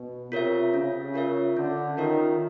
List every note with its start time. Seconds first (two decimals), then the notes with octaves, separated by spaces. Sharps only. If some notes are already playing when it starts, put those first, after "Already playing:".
Already playing: B2
0.32 C3 F4 A#4 C#5 E5
0.73 C#3 C#4
1.14 F4 A#4 C#5 E5
1.56 D3 C#4
1.97 D#3 F4 A#4 C#5 E5